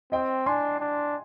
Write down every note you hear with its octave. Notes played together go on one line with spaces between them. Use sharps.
C4 D#5 G5
D4 G#5 C6
D4